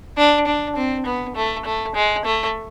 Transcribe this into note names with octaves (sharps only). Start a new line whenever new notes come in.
D4
D4
C4
B3
A3
A3
G#3
A3